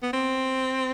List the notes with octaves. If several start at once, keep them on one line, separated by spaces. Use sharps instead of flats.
B3
C4